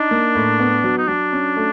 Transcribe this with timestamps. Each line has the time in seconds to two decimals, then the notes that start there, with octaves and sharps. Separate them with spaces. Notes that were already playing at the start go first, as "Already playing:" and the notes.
Already playing: D4 D#4
0.11 A#3
0.35 A2
0.60 B3
0.84 F#3
0.98 D#4
1.08 F#3 D4
1.32 C#4
1.56 A3